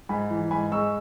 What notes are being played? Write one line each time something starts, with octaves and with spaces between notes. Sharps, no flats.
G#2 G#5 B5
E3
G#2 G#5 B5
G#3 C#6 E6